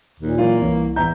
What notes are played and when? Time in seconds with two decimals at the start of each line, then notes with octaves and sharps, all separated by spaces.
0.20 D#2 A#2
0.38 E3 F#3 A#3 F4
0.62 C2 E3 C#5
0.96 E2 E5 A#5 G6